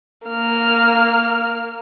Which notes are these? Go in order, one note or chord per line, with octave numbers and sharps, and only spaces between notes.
A#3 F6